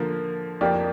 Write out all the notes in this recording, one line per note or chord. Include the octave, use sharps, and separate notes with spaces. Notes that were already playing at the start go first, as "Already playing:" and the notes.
Already playing: D3 F3 A#3
F2 F3 A#3 G4 D5